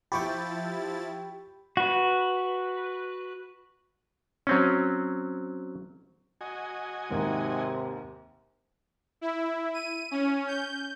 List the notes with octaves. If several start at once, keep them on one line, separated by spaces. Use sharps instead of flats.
F3 E4 G4 G5 B5 C#6 G6 A6
F#4 B4
F#3 C4 C#4
F#4 D#5 G#5
D#2 G#2 C3
E4
D#7
C#4
G6